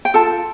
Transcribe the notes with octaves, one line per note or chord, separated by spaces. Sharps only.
G5
F4 A4 A5